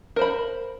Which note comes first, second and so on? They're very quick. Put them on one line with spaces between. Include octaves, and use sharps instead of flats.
A#4 C5 B5